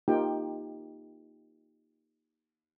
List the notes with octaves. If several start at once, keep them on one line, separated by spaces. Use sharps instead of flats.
A#3 D#4 F4 G4 G5